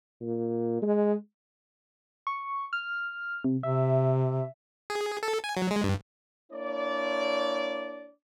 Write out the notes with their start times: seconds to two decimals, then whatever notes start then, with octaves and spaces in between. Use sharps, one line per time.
0.21 A#2
0.82 G#3
2.27 C#6
2.73 F6
3.44 C3
3.63 C3 E5
4.90 G#4
5.23 A4
5.44 G#5
5.57 F#3
5.71 G#3
5.84 G2
6.52 A#3 D4 E4 C#5 D5